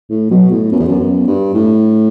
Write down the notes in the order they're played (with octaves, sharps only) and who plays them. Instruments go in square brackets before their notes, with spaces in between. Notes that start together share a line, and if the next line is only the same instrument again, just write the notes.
[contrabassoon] A2
[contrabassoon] B2 [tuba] F#3
[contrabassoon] A2
[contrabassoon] F#2 [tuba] B3
[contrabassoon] E2
F#2
F#2
G2
A2